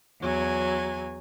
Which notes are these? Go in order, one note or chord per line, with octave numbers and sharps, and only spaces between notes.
E2 F#3 G#5